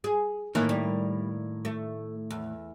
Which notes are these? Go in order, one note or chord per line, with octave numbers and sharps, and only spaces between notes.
G#4
A2 D#3 E3 A#3
G3
A3
E2